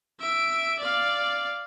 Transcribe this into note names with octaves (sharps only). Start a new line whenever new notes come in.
E5 D7
D5 F5